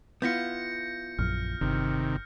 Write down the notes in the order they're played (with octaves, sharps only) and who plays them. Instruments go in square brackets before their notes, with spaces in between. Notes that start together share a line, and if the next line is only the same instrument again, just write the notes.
[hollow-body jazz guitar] B3 E4 F4 [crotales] G6 A#6 C#7
[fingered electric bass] A#1 F#2 [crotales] F6
[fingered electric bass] G1 [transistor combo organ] C3 D#3